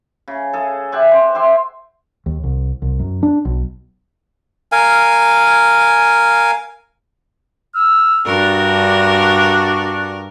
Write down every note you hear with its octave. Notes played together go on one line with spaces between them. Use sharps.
C#3
G#4 A4
G4 E5 F#5 G#5
C5
G4 E5 C6
D#2
C2
C2
F#2
D4
B1
A#4 F5 G#5
E6 F6
G2 D4 F#4 A#4